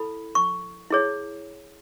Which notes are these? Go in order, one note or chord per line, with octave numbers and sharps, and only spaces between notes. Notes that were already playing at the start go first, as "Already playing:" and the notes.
Already playing: E4 A4 B5
C#6
E4 G#4 C#5